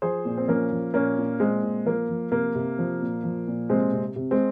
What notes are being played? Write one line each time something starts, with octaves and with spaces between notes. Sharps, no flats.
F3 G#4 C5
A#2
C4
F3 A#3 C#4
F3
A#2 A#3 C#4
A#2
A#2 G#3 C4
A#2
F3 A#3
F3
C3 A#3
C3
F3
A#2
F3
A#2
C3 G#3 C4
C3
C3
G#3 C4